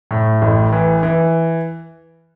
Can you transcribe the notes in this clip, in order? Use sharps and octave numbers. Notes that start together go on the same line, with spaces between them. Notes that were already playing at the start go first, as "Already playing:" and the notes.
A2
A1
E3
E3